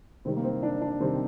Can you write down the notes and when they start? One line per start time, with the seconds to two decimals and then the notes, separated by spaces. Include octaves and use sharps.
0.25 C3 D#3 G3 C4
0.37 A#3
0.44 C4
0.63 D4
0.81 D4
1.00 C3 D#3 G3 C4